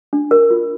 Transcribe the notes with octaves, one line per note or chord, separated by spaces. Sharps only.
D4
A#4
F4